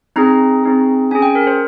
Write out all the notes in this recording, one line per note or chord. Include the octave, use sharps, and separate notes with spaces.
C4 D#4 G#4 A#5
C4 D#4 G#4
C#4 G#4 G#5
G5
A#4
C5